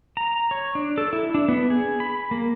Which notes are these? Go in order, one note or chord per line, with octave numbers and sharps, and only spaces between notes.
A#5
C#5
D4
A4
E4
D4
B3
G#4
B5
A#3